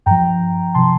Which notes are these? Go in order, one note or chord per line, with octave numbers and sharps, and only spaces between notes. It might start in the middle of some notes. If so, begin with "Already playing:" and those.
G2 F3 G5 A#5
C3 F3 A5 C6